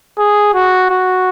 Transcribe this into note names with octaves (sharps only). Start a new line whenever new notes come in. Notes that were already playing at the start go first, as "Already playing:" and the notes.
G#4
F#4
F#4